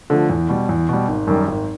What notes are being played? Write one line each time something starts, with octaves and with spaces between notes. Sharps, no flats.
D3 F3 A3
E2
B2 G3
E2
B2 G3
G#1
F#2 D#3 G3
G#1